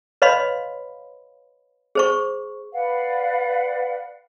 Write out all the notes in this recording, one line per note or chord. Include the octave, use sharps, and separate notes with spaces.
B4 C#5 D#5 F5 B5 C6
G#4 C5 C#6
B4 D5 F5 F#5